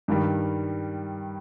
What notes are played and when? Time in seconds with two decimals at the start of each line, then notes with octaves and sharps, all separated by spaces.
0.08 G2 D#3 G3